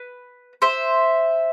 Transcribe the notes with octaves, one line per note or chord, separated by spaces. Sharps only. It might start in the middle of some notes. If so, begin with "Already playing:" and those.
Already playing: B4
C5 E5